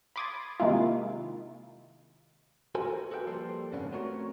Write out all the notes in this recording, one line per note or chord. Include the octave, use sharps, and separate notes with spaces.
B5 C6 D6 D#6 G#6 A6
C3 D#3 G#3 A#3 E4 F4
F#4 A4 A#4 C5 G#5
F#4 A4 B4 D#5 G5
F3 G3 A#3 A4 C5
F2 G#2 C#3 B3 C#4 D4
A3 C4 F#4 A#4 C5 C#5